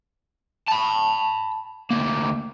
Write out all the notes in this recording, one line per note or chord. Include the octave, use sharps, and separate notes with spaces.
A5 B5
D2 A#3